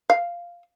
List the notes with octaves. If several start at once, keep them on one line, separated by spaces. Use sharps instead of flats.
F5